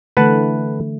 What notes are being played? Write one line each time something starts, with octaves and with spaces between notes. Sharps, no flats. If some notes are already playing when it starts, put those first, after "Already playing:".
D3 E3 A3 B4 F#5 A5